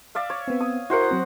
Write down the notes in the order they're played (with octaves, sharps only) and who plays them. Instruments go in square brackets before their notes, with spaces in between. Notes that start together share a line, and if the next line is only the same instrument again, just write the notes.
[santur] D5 E5 F5
C#5
[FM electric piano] B3 C4
[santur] D#6
[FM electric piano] E4 A#4 [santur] F#4 C5 F#5
[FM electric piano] F#3 C4